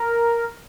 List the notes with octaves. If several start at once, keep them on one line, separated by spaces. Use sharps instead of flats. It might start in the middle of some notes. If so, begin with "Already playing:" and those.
Already playing: A#4